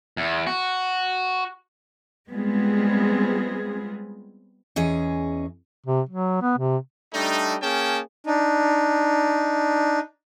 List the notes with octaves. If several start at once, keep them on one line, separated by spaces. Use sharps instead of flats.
E2
F#4
G3 G#3 B3 C4 F4 G#4
E2 C#4 G#4 D#5
C3
F#3
B3
C3
G3 A3 D4 D#4
A#3 C#4 G#4 G5 A5
D4 D#4